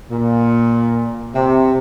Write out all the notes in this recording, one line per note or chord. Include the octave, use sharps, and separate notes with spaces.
A#2
C3